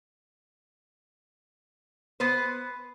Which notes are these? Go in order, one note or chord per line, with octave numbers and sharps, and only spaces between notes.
B3 B4 C5